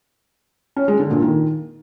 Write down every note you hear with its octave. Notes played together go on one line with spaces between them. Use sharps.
C#4
G#3
D3
A#2
D#3